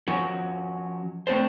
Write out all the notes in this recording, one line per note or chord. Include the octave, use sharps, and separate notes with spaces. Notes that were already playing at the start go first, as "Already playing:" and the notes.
F3 C#4 F#4
A3 C4 D4 A4 C5